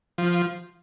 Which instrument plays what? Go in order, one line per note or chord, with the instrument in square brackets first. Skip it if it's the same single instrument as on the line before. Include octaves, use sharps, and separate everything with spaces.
[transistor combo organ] F3